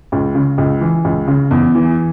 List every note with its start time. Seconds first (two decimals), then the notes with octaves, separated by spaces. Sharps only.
0.12 C#2
0.35 C#3
0.58 C#2
0.81 E3
1.04 C#2
1.28 C#3
1.51 E2
1.75 E3